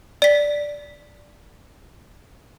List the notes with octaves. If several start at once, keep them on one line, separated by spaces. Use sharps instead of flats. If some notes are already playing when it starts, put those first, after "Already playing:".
D5 B6